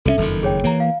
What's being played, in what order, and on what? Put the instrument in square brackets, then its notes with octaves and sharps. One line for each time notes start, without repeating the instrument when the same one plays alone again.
[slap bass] C2 G#3 C#4 [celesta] A4 E5
[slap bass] F#1 F2 D#3 [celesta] A4
[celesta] G#4 C#5 G5
[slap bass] E3 A#3 [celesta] C#5 A#5
[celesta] F5